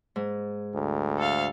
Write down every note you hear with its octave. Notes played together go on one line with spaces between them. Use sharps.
G#2
D2
A4 F5